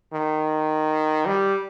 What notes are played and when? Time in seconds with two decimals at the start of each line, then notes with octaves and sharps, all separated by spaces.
0.13 D#3
1.26 G3